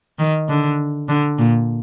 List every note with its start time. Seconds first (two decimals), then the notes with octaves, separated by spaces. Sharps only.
0.19 D#3
0.49 D3
1.09 D3
1.38 A#2